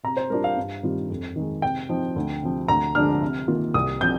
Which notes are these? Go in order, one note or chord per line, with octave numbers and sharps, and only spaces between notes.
C3 A#5
C5
G3 D4 F4 A#4
F5
G2
D#3 G3 C4 F4
F2
D#3 G#3
C3 G5
F3 C4 D#4
D2
C3 F3
D2 A#5
D3 F3 G#3 D4 F6
C3
D#3 A#3 F4
C2 D#6
C3 F3 G6